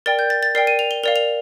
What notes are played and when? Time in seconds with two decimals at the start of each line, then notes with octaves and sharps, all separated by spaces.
0.06 A#4 D5 G5 A6
0.19 G6
0.30 A6
0.43 A6
0.55 A#4 D5 G5 C7
0.67 D#7
0.79 F7
0.91 G7
1.04 A#4 D5 F5 F7
1.16 F7